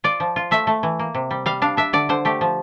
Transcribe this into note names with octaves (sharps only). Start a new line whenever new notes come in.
F4 D5
F3
F4
A3 E5
A3
E3
A#3
C3
G3
G3 F5
D4 F5
D4 E5
D3 D5
D3 C5
A3 G4
F3